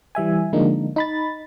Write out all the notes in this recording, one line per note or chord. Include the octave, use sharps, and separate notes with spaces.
E3 G3 E5 G#5
D3 F3 G#3 A#3 D4 D#4
D#4 B5 A6